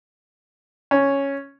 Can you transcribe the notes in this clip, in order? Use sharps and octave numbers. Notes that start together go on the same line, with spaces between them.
C#4